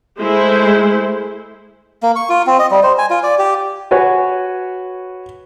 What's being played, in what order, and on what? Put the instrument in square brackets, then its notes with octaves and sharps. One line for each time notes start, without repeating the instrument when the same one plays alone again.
[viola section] G#3 A3 E4 C5
[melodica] A#3
C#6
F4
C4
D#5
G3
C5
G#5
F4
D5
G4
[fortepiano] F#4 B4 C#5 G#5